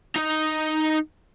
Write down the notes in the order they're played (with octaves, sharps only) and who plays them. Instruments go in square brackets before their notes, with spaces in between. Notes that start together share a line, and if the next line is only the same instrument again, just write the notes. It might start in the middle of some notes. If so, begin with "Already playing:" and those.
[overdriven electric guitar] D#4 D#5